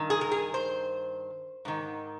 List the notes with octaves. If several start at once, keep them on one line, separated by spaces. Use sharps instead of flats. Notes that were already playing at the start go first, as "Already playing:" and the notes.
Already playing: G2 D#3
G#4
A#4
G#4
C5
G#2 D#3